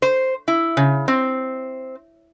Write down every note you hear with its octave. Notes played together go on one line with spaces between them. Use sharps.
C5
E4
C#3
C4